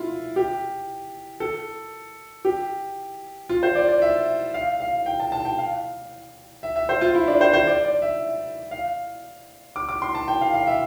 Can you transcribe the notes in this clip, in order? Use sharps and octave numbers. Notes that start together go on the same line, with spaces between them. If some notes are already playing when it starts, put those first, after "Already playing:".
Already playing: E4 F4
G4
A4
G4
F4
C5
D5
D5
E5
F5
F5
G5
A5
A5
G5
F5
E5
E5
C5
F4
E4
D4
C5
C5
D5
D5
E5
F5
D6
D6
C6
A5
G5
F5
F5
E5